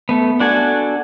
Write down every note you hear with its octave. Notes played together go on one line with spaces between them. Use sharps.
A3 B3
D4 F#4 A4 G#5